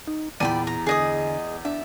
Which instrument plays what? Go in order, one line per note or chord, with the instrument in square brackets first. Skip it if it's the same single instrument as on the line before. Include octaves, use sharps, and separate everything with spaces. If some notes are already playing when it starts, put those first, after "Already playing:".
[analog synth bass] D#4
[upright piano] E2 D#7 [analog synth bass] A#2 [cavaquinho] D5 G5 B5
[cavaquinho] A#5
[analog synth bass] D3 [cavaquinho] G#4 D#5 D#6
[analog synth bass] D4 [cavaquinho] E5